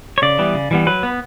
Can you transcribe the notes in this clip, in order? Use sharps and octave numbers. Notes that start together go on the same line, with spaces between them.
C#5
C#3 D5
E3 G3 B3
C#3
E3 G3 B3
F#3 B4
B3